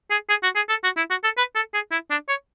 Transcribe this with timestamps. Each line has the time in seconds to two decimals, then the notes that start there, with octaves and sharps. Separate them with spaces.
0.11 G#4
0.29 G#4
0.43 F#4
0.56 G#4
0.69 A4
0.84 F#4
0.97 E4
1.10 F#4
1.24 A4
1.38 B4
1.56 A4
1.74 G#4
1.91 E4
2.11 D4
2.29 C#5